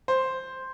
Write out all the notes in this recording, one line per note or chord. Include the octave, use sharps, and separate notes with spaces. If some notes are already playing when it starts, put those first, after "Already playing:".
C5